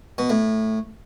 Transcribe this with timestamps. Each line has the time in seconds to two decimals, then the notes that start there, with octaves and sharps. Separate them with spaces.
0.18 B2
0.30 A2